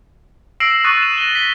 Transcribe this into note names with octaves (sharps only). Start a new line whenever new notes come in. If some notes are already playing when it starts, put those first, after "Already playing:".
E6 A#6 C7 D7 E7 F#7
C#6 D#6 F#6 A6 C#7 D#7
E7
A#6 D#7 G7
B6 G7